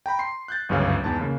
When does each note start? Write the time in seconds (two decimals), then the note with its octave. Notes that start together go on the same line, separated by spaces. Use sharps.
0.06 G5 A#5 B5
0.19 C6 C7
0.48 F#6 G6 A6
0.69 G1 C#2 F#2 C#3 C#4 F5
1.04 E2 G#2 A5
1.20 C#3 A#3